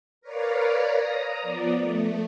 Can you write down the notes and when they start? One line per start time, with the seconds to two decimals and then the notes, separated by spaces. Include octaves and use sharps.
0.21 A#4 B4 C#5 D5 F5
0.93 A#5 D#6
1.42 F3 B3 D5
1.76 A3